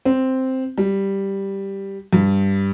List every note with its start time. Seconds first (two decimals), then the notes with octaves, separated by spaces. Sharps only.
0.05 C4
0.78 G3
2.13 G2